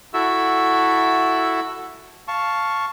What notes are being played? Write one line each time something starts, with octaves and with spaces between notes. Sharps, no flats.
E4 F#4 A4 E5 E6
F5 A5 C#6